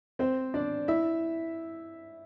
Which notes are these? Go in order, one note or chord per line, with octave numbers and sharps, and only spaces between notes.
C4 C5
D4 D5
E4 E5